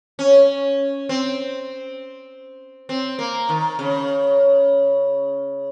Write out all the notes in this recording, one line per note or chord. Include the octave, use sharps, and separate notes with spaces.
C#4
C4
C4
A#3
D#3
C#3